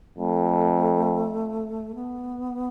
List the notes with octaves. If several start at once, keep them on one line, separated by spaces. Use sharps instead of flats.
F2 A3
B3